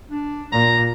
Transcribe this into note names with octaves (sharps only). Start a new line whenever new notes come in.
D4
A#2 A#5